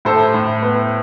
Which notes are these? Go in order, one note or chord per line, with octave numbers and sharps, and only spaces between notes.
A2 A4 C5
A2
B3